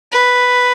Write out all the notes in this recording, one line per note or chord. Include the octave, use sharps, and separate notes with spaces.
B4